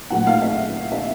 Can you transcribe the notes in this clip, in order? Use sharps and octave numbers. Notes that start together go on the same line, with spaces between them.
A#2 F#3 A3 F#5
F5
E5
E5